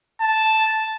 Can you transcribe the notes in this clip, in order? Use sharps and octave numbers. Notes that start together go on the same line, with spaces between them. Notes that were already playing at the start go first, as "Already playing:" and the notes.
A5